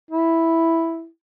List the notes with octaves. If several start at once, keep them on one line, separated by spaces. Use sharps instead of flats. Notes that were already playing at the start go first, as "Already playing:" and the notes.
E4